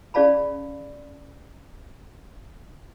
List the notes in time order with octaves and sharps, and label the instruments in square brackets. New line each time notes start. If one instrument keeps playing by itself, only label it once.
[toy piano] C#4 G#4 D5 F5 A5 B5